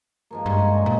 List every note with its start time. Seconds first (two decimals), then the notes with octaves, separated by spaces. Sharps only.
0.31 G#2 F3 A#3
0.46 G2 C#5 D5 G#5
0.58 C#4 C5 A#5
0.74 D3 G#3 D#4
0.86 A#2 B4